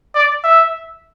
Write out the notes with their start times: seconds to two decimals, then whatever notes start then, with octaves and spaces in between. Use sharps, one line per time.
0.15 D5
0.44 E5